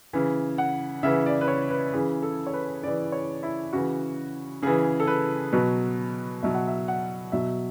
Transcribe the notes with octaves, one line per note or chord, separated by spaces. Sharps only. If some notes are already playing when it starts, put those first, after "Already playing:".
C#3 E3
F#5
C#3 E3 E5
D5
B4
C#5
B4
C#3 E3 G#4
A4
C#5
B4
C#3 E3 D5
C#5
E4
C#3 E3 F#4
C#3 E3 G#4
A4
B4
B2 F#3 B4
B2 F#3 E5
F#5
E5
F#5
B2 F#3 E5